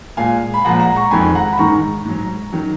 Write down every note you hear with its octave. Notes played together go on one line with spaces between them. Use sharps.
A#2 G#3 F5 G#5
B5
A#2 F3 G#3 F#5 A#5
F#5 A#5
A#5 C#6
F2 D#3 G#3 G#5 B5
F#5 A#5
B5
G#2 D#3 G#3 A#5 C#6
G#2 F#3
D#3 F#3